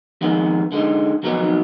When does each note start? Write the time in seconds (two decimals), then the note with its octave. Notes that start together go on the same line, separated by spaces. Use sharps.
0.21 F2 D#3 G#3 B3
0.72 D3 G#3 D#4
1.23 F2 D#3 F#3 B3 D#4